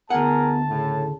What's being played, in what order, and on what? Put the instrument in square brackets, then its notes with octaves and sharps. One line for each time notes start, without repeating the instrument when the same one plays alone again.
[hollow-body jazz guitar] D2 F#5 [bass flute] B3 [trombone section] E4 G#4 A#4 [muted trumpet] A5
[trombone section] A2 [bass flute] C#3